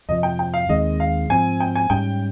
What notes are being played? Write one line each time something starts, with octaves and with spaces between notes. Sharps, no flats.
F2 C3 F3 D#5
G5
G5
F5
D#2 D#3 G#3 C4 D#5
F5
G#2 F3 C4 G#5
G5
G#5
G#2 G3 C#4 G5